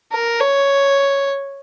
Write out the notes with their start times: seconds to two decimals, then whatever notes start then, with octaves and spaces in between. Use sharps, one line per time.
0.13 A#4
0.40 C#5